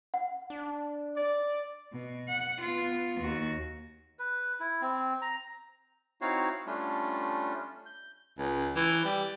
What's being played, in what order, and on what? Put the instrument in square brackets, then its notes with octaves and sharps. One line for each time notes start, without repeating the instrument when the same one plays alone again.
[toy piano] F#5
[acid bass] D4
[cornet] D5
[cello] B2
F#5
B3 F4
D#2 F#4
[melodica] B4
E4
C4
A#5
[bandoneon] C4 D#4 E4 F#4 C#5 F5
G3 A3 C#4 D4 F4
G6
[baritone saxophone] C#2
E3
G3